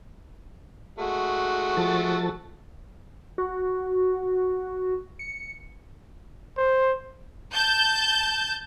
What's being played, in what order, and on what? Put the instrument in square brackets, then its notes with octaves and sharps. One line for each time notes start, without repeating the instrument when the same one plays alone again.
[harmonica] G#3 A3 F#4
[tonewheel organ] F3 A4 A6
[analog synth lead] F#4
C#7
[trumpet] C5
[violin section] A5 G6